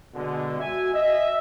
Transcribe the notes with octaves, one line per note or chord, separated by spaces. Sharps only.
B2 D3 G#3
F#4 E5 G#5
D#5 E5